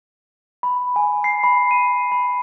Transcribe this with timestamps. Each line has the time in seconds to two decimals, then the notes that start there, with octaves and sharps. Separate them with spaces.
0.63 B5
0.96 G#5
1.24 C7
1.44 B5
1.71 D#7
2.12 B5